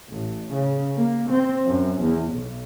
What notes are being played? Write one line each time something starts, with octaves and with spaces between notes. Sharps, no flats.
A1
C#3
A#3
C4
F#2
E2
B1